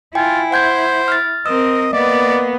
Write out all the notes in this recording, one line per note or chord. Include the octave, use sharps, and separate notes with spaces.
E4 F4 G5 G#5
C5 F#5 G6 G#6
F6 A6
C4 A#4 D#5 E6
A#3 B3 D5 D#5